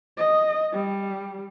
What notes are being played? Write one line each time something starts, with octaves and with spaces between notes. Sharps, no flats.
D#5
G3